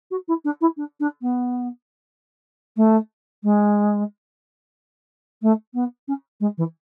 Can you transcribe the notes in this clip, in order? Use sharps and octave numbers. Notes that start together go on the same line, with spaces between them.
F#4
E4
D4
E4
D4
D4
B3
A3
G#3
A3
B3
C#4
G#3
E3